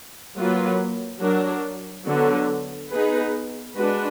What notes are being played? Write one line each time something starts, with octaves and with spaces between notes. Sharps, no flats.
F#3 A#3 F4 B4
F#3 D4 F#4 A#4
D3 F#3 B3
B3 D#4 G#4 B4
G#3 D4 F#4 B4